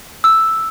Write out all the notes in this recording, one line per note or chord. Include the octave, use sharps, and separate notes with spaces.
E6